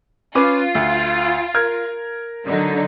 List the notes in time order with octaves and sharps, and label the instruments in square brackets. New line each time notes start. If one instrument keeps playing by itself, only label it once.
[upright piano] C#4 B4 D6 [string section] F4
[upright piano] D2
A#4 F6 G#6
[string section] D3 F#3 D#4